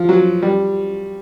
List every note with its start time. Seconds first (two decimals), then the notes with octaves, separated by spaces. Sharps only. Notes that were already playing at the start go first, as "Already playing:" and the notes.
Already playing: F3
0.09 F#3
0.43 G3